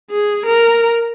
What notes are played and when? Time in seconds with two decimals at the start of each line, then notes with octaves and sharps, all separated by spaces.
0.11 G#4
0.46 A#4